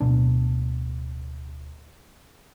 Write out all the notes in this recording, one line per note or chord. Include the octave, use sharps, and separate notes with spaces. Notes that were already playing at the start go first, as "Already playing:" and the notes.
D1 B2 D4